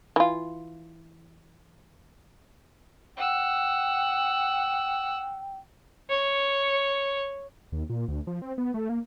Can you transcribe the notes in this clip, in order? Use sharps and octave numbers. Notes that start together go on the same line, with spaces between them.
E3 F4
F#5 G5 E6
C#5
D#2
A#2
D2
F3
C4
B3
A3
A#3